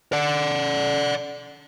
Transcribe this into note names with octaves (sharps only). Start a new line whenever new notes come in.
D5 F#5